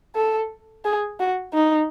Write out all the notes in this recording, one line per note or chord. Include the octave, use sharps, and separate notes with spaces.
A4
G#4
F#4
D#4